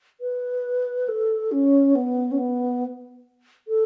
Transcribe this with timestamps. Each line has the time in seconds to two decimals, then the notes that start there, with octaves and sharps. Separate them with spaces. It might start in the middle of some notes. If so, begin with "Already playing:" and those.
0.20 B4
1.08 A4
1.51 C#4
1.95 B3
2.31 C#4
2.38 B3
3.68 A4